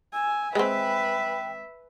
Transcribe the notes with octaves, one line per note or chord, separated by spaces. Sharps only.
G#5 E6
G#3 C4 B4 E5 G5